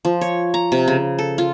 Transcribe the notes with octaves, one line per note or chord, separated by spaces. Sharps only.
F3
C#5
A#5
C3
C#3
A4
F4